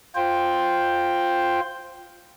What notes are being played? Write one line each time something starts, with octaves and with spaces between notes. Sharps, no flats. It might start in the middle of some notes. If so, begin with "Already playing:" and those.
F4 C5 G5